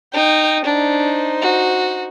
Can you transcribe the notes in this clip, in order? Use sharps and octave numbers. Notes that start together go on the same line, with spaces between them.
D#4 G5
D4 D#4 C5
F#4